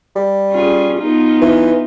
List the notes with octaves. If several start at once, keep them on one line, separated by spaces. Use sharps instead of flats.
G3
C#4 F4 G#4
B3 D#4 F4
E3